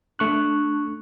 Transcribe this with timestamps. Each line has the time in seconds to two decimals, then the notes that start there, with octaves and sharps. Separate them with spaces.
0.19 A3 D4 C#6 F#6